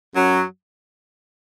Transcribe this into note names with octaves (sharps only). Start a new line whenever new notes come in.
F#2 F#3